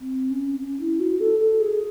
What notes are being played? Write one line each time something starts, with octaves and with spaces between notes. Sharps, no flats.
C4
C#4
C#4
E4
F#4
A4
A4
G#4